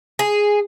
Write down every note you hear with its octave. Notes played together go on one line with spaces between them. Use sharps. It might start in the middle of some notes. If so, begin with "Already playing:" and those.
G#4